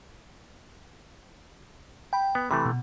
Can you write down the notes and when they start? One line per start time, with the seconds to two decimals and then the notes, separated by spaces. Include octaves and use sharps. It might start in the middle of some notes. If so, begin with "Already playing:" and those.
2.13 G5 B5
2.35 B3
2.51 C3 E3 A3 B5
2.66 B2